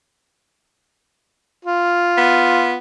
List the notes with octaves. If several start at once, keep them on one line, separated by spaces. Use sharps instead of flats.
F4
B3